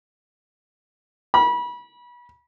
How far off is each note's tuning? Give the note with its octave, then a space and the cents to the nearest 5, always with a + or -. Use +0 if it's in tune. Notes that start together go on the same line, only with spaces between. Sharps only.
B5 -30